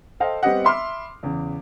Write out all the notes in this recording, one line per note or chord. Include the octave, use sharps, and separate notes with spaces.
A4 C5 D#5 F5 G5
G3 B3 C4 G4 D#5 F#5
E5 B5 C6 D6 F6
E2 C#3